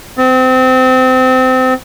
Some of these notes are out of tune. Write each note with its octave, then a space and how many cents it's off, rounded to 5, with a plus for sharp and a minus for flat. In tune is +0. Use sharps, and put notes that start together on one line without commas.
C4 -25